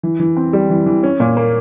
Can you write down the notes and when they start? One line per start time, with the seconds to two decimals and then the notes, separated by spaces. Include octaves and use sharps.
0.03 E3
0.20 E3
0.37 C4
0.53 G3
0.70 E3
0.86 E3
1.03 C#4
1.20 A#2
1.37 A#3